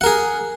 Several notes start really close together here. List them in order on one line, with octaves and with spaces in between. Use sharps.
F#5 A#4 G#4